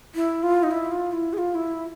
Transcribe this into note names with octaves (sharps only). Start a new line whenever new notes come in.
E4
F4
D#4
E4
F4
E4
G#4
F4
E4